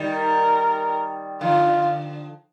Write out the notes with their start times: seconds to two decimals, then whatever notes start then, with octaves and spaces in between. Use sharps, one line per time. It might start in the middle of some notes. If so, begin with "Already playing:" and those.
Already playing: D#3 G3
0.15 A#4
1.41 D3 F3 F4